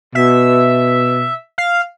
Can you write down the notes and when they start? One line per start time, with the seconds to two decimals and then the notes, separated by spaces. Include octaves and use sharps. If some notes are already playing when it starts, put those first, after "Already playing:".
0.15 B2 E5
1.58 F5